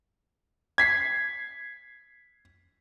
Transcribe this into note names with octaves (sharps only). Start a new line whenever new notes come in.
G#6 B6 C7